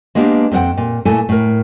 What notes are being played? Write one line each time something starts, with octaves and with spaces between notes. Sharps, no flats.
G#3 A#3 B3 D4 G4
F2 C4 D4 F#5 G5
A#2
A#2 A3 E4 A4 G#5
A2 A#4